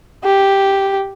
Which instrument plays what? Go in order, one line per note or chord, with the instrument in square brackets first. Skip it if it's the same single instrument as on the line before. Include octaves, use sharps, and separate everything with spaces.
[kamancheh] G4